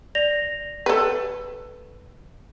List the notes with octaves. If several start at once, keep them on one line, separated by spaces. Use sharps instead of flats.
D5 A#6 F7
A4 B4